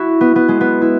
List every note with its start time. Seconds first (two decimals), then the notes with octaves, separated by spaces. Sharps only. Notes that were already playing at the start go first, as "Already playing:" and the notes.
Already playing: E4 F#4
0.21 B3
0.36 B3
0.48 G#3
0.61 B3
0.81 E4